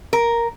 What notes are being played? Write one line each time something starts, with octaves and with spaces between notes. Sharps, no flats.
A#4